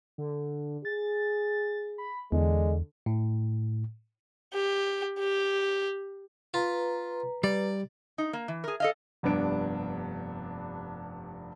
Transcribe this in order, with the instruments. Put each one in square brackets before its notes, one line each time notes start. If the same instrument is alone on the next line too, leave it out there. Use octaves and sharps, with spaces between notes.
[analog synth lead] D3
[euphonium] G#4 [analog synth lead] A6
[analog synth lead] B5
[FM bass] E2 [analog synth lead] D3 [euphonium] G#3
[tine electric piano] A2
[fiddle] G4
G4
[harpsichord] F4 [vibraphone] B4 A#5
[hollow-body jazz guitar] G3 [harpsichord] D5
[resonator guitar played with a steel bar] D#4
A#3
E3
G#4 A#4
A4 D#5 F5
[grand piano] F1 G2 B3 D4 D7